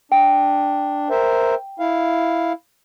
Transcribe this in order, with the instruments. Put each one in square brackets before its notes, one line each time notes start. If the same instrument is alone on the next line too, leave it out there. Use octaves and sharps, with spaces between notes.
[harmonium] D4 [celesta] G5
[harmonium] A#4 C5 E5
E4 F5